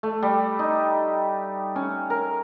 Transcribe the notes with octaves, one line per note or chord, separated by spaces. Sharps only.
A3
G3
D#4
C#4
A#4